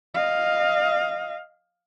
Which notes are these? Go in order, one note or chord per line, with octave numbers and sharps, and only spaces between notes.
D#5 F5